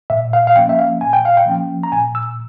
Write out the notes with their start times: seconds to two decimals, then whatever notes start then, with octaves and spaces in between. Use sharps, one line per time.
0.10 A#2 E5
0.33 F5
0.47 F5
0.55 F3 A#3 C#4 G5
0.69 E5
0.79 F5
1.01 A#2 G#5
1.13 G5
1.25 F5
1.37 G5
1.46 F3 A#3 C#4
1.83 A#5
1.92 A#2 G#5
2.15 E6